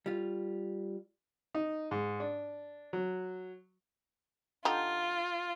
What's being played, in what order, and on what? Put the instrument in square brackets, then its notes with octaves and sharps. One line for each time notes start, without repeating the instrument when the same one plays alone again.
[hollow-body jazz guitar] G3 F4
[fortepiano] D#4
G#2
D4
F#3
[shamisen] D3 D#4 G4 [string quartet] F4